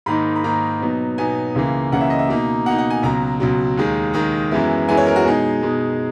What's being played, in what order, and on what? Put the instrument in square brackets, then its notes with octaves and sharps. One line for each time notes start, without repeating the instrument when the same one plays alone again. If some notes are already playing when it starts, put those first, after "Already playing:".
[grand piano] G#2 D#3 A#3 D#4 B5
B5
G#2 D#3 A#3 D#4 A#5
B2 F#3 B3 D#4
B2 F#3 B3 D#4 G#5
C#2 C#3 E3 A#3
C#2 C#3 E3 A#3 F#5
E5
D#5
E5
B2 A#3 D#4
B2 A#3 D#4 F#5
F#5
G#5
C#2 B2 F#3 A#5
C#2 B2 F#3
D#2 D#3 G#3
D#2 D#3 G#3 A#5
F#2 E3 G#3 B3 E4
F#2 E3 G#3 B3 E4 G#5
C#5
A#4
F#4
B2 G#3 D#4 G#4
B2 G#3 D#4